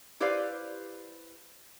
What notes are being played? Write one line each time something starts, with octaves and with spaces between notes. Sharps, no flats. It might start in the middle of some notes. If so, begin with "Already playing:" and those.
E4 G4 B4 C5 D5 F5